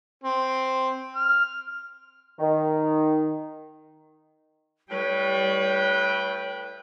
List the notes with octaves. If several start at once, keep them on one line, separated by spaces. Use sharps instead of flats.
C4
F6
D#3
A2 G3 B4 C#5 G5